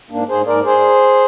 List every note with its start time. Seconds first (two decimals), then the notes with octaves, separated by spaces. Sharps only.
0.10 G#2 A#3 D4
0.29 G#2 G#4 C5
0.46 G#2 A#4 D5
0.65 G#4 C5